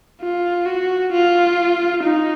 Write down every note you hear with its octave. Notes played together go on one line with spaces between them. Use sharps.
F4
F#4
F4
D#4